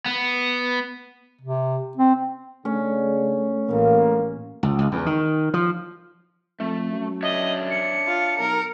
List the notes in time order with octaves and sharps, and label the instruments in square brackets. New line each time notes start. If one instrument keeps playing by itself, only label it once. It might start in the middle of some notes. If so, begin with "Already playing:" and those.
[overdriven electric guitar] B3
[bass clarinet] C3
C4
[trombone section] C#3 D4 [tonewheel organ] A3 [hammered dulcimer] C#4
[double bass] A1 [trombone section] A#3
[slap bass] C#2
C#2
E2
D#3
F3
[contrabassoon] F2 [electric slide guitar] A3
[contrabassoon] F#2
[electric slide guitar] D4 C#5 E5 [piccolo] D#5
[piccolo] C#7
[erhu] F4
[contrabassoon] B1 [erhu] A#4